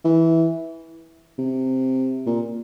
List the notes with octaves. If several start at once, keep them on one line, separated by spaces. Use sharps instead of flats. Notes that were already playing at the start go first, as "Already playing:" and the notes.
E3
C3
A#2